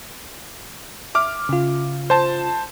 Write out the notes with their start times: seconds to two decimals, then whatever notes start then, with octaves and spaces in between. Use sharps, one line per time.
1.15 E5 D6 F6
1.49 C#3 F4
2.10 C5 A5